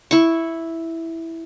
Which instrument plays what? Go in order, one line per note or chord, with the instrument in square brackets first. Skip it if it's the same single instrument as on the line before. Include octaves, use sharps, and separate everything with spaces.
[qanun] E4 C#6